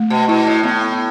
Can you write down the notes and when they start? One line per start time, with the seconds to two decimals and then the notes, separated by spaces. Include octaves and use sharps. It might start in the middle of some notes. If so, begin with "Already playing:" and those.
Already playing: A3
0.10 B2
0.28 B2 E4
0.47 A2
0.63 A2 B3